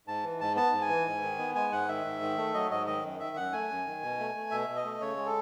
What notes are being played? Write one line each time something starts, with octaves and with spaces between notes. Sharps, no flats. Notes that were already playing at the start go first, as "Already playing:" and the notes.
G#2 A5
E3
G#2 A5
B3 A5
G#2
G#5
E3
G#2
D#3
B3
G#3 G#5
G#2 F#5
D#3 E5
G#2
D#3
A3
F#3 D#5
G#2 D#5
D#3 D#5
F#2
D#3 E5
F#2 F#5
A3 G#5
F#2
D#3
B2
A3
A3
B2 E5
B2
D#5
A3
C#3 C#5
G#3
A4